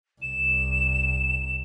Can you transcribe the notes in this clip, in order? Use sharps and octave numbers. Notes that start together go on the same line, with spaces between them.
C2 E7